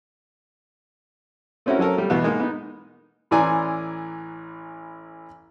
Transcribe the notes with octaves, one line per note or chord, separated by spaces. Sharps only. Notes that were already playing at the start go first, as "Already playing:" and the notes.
A3 C4 C#4 E4 F#4 A#4
F#3 C#4 A4 A#4
G3 A3
E2 B2 A3 B3
G#3 A#3 D#4
B3 D#4
A1 E3 D5 G#5 A#5 C6